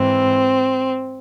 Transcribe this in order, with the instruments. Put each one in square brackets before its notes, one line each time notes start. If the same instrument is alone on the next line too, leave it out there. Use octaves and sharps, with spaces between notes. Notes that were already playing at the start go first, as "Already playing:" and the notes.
Already playing: [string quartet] G#2 E3 C4